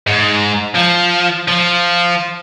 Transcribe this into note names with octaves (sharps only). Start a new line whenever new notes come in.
G#2
F3
F3